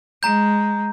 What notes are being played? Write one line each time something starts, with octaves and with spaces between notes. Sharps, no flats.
G#3 A#5 G6